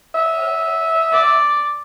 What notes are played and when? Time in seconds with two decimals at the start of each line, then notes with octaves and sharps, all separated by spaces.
0.14 E5
1.12 D5